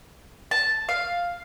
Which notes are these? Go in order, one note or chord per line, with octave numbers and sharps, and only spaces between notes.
A5
F5